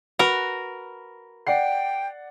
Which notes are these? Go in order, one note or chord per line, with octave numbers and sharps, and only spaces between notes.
F#4 A#4 B4
D5 F#5 G5 C7